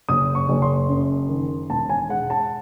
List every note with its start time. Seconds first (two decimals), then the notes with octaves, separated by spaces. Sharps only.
0.09 F#1 D#6
0.35 C#6
0.49 F#1
0.62 C6
0.89 F#2
1.29 D#3
1.69 E1 A5
1.90 G#5
2.09 G#3 F#5
2.30 A5